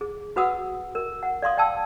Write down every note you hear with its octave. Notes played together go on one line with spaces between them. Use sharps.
G#4
F#4 B4 F#5 D#6 E6
A#4
F#5
D5 F5 C6 D#6
D5 G5 A5 E6